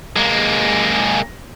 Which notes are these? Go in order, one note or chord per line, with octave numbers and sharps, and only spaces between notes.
G#3 A#3